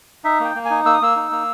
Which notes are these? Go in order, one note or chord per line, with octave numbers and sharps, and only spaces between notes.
D#4 E5
A#3 G5
A#3
G#5
D#4
A#3 E6
D#6
A#3 E6
D#4
A#3